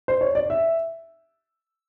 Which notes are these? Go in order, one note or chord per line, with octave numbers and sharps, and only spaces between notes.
C5
C#5
D5
E5